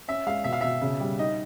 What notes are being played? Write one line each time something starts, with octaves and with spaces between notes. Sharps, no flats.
C#4 E5
G#3 F5
B2 E5
F5
B2 E5
C#3
G3
D#4 D#5